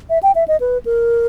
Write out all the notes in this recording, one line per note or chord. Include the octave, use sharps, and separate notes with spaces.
E5
G5
E5
D#5
B4
A#4